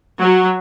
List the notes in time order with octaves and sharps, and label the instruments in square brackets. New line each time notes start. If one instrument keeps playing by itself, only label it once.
[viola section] F#3